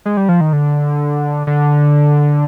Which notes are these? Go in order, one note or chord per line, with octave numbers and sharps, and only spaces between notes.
G#3
G3
F3
D#3
D3
D3